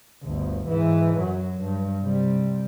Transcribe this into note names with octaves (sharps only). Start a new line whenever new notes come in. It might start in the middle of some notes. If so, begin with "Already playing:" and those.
G1 D2
G#2 E3
F#2 F#3
G2
C3 G3